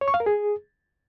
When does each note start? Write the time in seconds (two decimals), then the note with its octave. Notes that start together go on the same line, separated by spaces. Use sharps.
0.01 C#5
0.08 C#6
0.14 F5
0.20 A#4
0.26 G#4